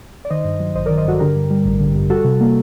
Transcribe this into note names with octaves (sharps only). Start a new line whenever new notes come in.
D5
D#3 C5 D#5
G2
F#3
A1 C5 D#5
D#3 A#4 D5
C5 D#5
G2 F#4 A4
D3 G4 A#4
G2
G3
A1
D3
G2
G3 F#4 A4
C3
A#3